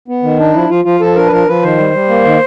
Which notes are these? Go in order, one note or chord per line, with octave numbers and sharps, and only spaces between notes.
B3
D#3
D4 D#4
F3 E4
F3 F4
F3 F4
F3 A4
D4 A#4
B4
F3 A#4
F3 B4
D#3 C5
G3
G3
A#3
D#3